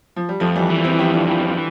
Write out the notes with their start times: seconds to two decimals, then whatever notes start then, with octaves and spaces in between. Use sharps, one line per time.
0.16 F3
0.29 G3
0.40 F2 F3 A3
0.55 E3 G3
0.70 E3
0.84 C4 E4
0.99 F2 E4 G4
1.13 D4 F4
1.27 E3 E4 G4
1.42 D4 F4